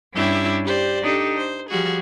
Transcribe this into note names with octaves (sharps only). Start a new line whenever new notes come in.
G2 C#4 D4 E4 G4 E5
G4 C5 D5
D4 D#4 G4 A4
C5
F3 G3 F#4 G#4